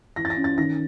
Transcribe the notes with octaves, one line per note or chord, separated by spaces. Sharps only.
E3 A#6
A6
A#6
C#4
A6
D#3 A#6